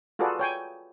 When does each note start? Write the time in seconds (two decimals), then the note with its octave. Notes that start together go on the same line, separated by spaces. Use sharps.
0.19 F4 F#4 G#4 A4 B4 D5
0.39 C#5 G5 G#5